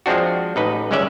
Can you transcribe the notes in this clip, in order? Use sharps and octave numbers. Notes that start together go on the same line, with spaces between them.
F3 G#3 C4 D4 F#4
A1 D#4 B4
G1 C#2 G#3 C#4 D5 E5